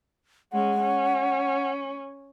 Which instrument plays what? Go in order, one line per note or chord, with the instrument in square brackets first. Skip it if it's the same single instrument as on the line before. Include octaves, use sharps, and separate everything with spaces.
[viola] G#3 C#4 [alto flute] F#5
[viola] C#4